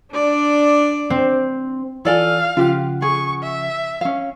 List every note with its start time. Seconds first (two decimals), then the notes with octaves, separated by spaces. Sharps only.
0.13 D4 D5
1.10 C4
2.05 E3 F4 A4 D5 F5 G#5
2.57 C#3 F3 F4 G4 F#5
3.02 G#4 C#6
3.43 E5
4.01 C#4 F5